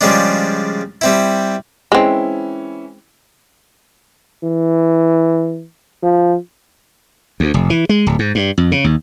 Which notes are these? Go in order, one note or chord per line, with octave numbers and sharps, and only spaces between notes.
C#3 F3 G3 G#3 D4
G3 C4 E4
E3 G#3 C4 C#4 E4
E3
F3
D2
F1
E3
G#3
D1
G#2
G2
F2
C#3
D#2